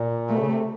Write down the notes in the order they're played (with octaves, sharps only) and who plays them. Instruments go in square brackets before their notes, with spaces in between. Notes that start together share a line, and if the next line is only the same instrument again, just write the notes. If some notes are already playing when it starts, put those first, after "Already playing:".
Already playing: [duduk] A#2
[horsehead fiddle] A3
[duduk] C#3
C3